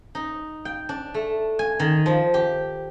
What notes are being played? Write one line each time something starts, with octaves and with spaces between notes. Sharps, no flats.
D#4
G5
D4
A3
G#5
D#3
F3
G4